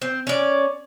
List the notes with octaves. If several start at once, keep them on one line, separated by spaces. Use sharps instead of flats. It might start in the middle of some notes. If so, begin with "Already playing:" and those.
C4
C#4 D5